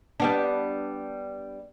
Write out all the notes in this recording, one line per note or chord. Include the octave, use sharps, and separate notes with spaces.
G3 B3 D4